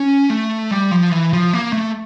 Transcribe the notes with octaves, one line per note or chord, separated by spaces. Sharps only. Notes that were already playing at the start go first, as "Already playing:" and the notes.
Already playing: C#4
A3
G3
F3
E3
F3
A#3
A3